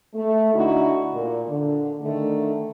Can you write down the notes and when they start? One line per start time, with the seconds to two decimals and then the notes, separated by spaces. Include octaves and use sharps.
0.14 A3
0.53 D3 D#4 E4 F#4
1.13 A#2
1.48 D3
2.02 D3 D#3 A3